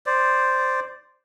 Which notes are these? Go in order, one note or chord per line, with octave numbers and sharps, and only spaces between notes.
C5 D5